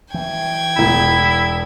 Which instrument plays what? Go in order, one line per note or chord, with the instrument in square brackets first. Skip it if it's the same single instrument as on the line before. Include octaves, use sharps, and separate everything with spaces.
[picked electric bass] E3 [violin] G5 G#6
[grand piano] E1 E2 [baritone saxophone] E4